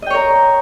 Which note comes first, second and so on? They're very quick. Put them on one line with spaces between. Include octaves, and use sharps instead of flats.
D#5 G5 C#5 A#4